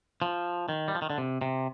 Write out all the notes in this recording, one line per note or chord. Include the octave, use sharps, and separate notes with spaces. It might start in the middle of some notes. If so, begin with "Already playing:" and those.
F3
D#3
G3
F3
D#3
D3
C3
C3